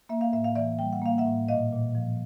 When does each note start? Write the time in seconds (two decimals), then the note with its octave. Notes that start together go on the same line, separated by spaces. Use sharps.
0.09 A#3 E5
0.21 F5
0.33 A2 E5
0.44 F5
0.55 E3 D5 E5
0.79 G3 G5
0.93 F#5
1.02 A#3 F5
1.18 E5 F#5
1.26 A2
1.48 A#2 D#5 F5
1.72 A#2
1.95 F3